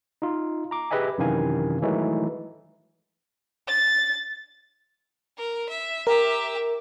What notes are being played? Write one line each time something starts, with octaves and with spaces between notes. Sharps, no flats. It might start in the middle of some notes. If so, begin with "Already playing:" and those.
D#4 F4
A#5 D6
G4 G#4 B4 D#5 E5 G#5
F#2 C3 D#3 E3 F5 G#5
D#3 E3 F#3 G#3 A3 D#4
A6
A#4
E5
G4 A#4 E5